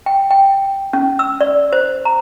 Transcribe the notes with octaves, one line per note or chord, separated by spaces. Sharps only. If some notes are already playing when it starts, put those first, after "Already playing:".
G5
G5
C#4
E6
D5
C5
A#5